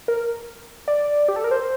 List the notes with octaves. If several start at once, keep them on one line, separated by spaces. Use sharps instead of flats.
A#4
D5
G4
A4
A#4
C5